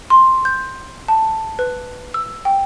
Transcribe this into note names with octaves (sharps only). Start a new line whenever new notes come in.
C6
G6
A5
B4
E6
G5